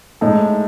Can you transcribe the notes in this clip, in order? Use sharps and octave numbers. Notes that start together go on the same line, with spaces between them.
A2 G#3 D#4 A4